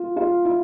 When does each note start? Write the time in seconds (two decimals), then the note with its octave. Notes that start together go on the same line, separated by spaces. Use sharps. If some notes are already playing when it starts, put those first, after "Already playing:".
Already playing: F4
0.16 F4
0.45 E4